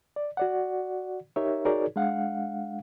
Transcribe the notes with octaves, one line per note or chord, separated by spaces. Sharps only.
D5
F#4 D5 F#5
D#4 G4 A#4 C#5 E5
D#4 F#4 G#4 A#4 C#5 D5
G#3 D4 F5 F#5